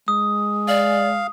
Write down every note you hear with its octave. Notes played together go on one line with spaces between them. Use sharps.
G#3 D#6
D5 F5